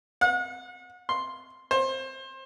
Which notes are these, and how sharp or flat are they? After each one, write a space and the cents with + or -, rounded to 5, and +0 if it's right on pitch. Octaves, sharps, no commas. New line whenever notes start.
F#5 -35
C6 +0
C5 +25